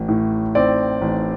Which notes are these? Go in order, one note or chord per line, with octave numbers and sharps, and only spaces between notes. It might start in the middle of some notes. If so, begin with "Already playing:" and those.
Already playing: A1
A2
C4 D5
A1